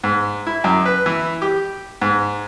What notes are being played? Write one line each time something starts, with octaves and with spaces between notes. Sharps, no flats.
G#2
E4
F#2
B4
E3
G4
G#2